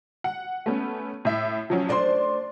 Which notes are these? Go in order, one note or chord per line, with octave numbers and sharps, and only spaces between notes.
F#5
A3 B3 C#4
A2 E5
F3 F#3 C#4
A3 D4 C5 D5 C6